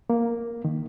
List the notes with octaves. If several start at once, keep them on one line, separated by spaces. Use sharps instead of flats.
A#3
D#3